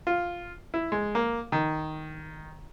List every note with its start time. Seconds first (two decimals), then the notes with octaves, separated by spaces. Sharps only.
0.07 F4
0.74 E4
0.92 G#3
1.15 A#3
1.52 D#3